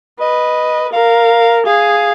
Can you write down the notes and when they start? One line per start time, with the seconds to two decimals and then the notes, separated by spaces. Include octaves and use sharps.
0.21 B4 D#5
0.93 A#4 F5
1.66 G#4 F5